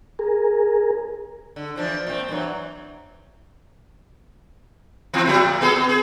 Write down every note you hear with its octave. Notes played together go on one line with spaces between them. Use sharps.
G#4 A#4
D3
E3 F3 D4
A#2 C4
G2 E3 F#3
E3 F3 C4
F3 G3 A3
A#2
B3 G#4 A4
B3
G#4